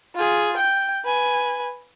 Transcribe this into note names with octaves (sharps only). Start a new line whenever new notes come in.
F4 G#4
G5
B4 G#5